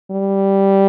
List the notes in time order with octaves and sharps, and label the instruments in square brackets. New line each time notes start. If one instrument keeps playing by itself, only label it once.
[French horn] G3